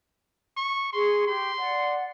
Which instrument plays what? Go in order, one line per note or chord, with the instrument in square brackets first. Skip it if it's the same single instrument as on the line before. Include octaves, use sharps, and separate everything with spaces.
[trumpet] C#6
[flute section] G#4 C#6 [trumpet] C6
[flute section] G4 [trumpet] C6
[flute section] D5 F#5